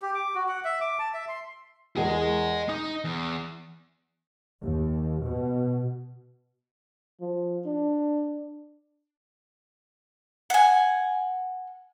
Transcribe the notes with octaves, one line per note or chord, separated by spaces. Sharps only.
G4
D6
F#4
F#5
E5
D6
A5
E5
C6
E2 G#3 G#4 A#4 D#5
D#4 D#6
E2
D#2
B2
F3
D4
F#5 G#5